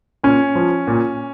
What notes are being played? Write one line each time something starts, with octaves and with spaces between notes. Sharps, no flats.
A#2 C#4
F3
A#2